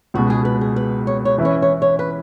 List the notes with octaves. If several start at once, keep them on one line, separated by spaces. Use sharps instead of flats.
C#2 B2 G#3 F#4
G#4
B4
G#4
B4
C#5
C#5
E3 C#4 E4 B4
C#5
C#5
C#5
B4